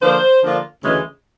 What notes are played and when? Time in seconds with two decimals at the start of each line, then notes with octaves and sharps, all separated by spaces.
0.02 D3 F3 A#3 D4 F4 C5
0.43 D3 F3 A#3 D4 F4
0.84 D2 C#3 E3 G#3